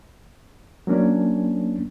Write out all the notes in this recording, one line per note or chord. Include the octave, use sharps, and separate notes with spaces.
F#3 A#3 C#4 D4